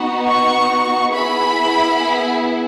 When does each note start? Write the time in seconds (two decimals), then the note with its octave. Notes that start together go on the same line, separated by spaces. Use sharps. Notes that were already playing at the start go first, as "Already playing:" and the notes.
Already playing: B3 D#4 F#4
0.27 C#6
1.13 B3 E4 G#4 B5